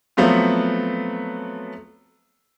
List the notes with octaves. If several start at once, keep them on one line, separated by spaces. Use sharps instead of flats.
F3 F#3 A3 B3 C4 F4